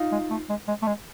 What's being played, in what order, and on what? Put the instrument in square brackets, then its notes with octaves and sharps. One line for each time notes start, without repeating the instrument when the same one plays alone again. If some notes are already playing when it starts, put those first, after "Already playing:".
Already playing: [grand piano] D#4 F4
[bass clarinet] G#3
A3
G#3
G#3
A3
G#3